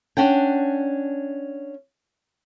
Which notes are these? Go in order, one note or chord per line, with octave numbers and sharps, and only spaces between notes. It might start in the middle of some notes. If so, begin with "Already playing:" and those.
C#4 D4 F#5 G5